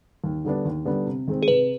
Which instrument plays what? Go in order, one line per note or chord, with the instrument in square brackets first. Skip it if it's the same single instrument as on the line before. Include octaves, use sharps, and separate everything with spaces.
[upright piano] D#2
D3 G3 B3 D4
D#2
D3 G3 B3 D4
C3
D#3 G#3 C4
[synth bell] G#4
[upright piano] C3 [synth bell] B4